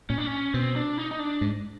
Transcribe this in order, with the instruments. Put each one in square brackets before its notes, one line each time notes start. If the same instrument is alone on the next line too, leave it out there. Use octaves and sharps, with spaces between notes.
[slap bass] A#2 [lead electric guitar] C#4
[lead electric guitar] D4
C#4
[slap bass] B2 [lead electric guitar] C4
[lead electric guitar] D4
D#4
D#4
D4
[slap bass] G#2